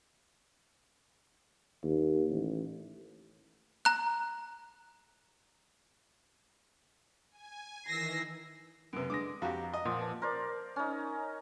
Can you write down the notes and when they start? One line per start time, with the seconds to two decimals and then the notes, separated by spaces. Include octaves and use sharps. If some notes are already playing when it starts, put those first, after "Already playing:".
1.84 D#2
2.30 A1
3.85 A#5 F#6
7.31 G#5
7.86 D#3 E3 E6 A#6 C7
8.93 F#2 C3 B4 D7
9.10 D3 G#3 D6 D#6 A#6
9.42 F2 F#4 G4 F5 A#5
9.74 D#5
9.85 A#2 F3 F#5 C6 D#6
9.99 B4 A5
10.22 A#4 C5 D5 D6
10.76 C#4 D#4